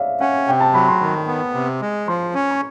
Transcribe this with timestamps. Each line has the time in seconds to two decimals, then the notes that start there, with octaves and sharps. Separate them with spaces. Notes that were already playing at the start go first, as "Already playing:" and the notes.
Already playing: C#5 D5 E5 F5
0.20 C#4 F#5
0.47 C3 G5
0.60 A5
0.74 F#3 B5
0.88 C6
1.01 D#3
1.27 B3
1.54 C3
1.81 G#3
2.08 F3 C6
2.34 C#4
2.51 C#6